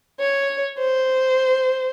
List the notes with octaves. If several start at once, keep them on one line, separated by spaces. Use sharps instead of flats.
C#5
C5